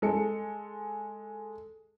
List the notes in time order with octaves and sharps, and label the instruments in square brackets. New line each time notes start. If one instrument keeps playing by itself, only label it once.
[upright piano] G#3 A4 C#7